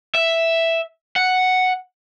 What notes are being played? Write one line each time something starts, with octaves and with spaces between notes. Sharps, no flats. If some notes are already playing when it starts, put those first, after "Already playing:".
E5
F#5